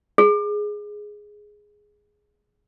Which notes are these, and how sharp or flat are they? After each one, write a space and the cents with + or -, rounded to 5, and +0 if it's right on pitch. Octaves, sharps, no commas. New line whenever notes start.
G#4 +5